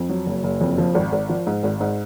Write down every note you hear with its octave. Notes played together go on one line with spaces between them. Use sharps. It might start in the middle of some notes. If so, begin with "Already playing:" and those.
Already playing: F2
F#3
F#1
F#1
F2
F3
G#1
G#1
F3
G#2
G#1
G#2